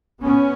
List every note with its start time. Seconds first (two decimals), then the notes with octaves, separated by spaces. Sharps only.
0.23 B3 C#4